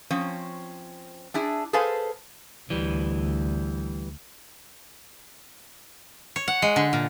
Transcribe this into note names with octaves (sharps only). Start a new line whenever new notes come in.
F3 C4 C#4
D4 E4 G#4
G#4 A4 B4 C5 F5 G#5
D2 E3 G3
C#5
F#5
G#3
D3
A#2